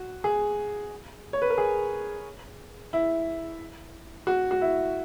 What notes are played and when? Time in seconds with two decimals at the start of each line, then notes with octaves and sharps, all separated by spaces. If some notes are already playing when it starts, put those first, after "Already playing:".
Already playing: F#4
0.24 G#4
1.33 C#5
1.42 B4
1.50 A#4
1.58 G#4
2.93 E4
4.27 F#4
4.51 F#4
4.61 E4